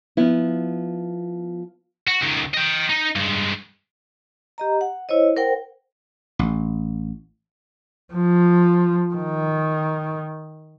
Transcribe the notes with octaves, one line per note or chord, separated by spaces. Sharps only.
F3 B3 E4
F#4
C#2 D#3
D#5 G5
D#4
G2 G#3
G4 D#5 A#5
F#5
E4 C5 C#5 D#5
A#4 C5 F#5 G5
A1
F3
D#3